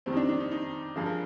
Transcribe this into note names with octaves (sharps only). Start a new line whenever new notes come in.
F2 D#3 G3 C4
D#4
D4
D4
D#4
D#4
G2 D3 F3 G#4
A#4